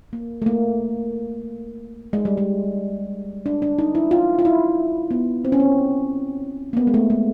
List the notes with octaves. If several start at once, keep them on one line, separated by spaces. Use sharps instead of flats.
A#3
A3
A#3
G#3
G3
G#3
D4
D4
D#4
E4
F4
F4
E4
B3
C4
C#4
C4
A#3
B3
G#3
A3
G#3